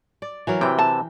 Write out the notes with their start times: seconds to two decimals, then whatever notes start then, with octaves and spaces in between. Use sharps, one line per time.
0.22 D5
0.47 E3 F#3 A#4
0.61 C3 E3 G5
0.79 A5